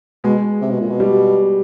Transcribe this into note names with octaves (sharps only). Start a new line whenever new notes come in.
B2 G#3
C3
B2
A#2
B2
G3